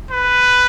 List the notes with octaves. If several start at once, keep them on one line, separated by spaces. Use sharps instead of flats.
B4